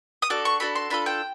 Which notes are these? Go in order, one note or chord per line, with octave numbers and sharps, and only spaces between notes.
D#6
D4 F#4 A4 D6
C#6
D4 F#4 A4 B5
C6
D4 F4 A4 B5
G5